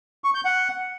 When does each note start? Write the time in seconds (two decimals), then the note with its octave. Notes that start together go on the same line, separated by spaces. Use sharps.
0.24 C#6
0.34 G6
0.45 F#5